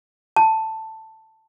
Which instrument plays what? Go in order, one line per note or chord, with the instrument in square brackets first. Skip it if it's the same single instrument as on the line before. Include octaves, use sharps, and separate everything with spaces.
[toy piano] A5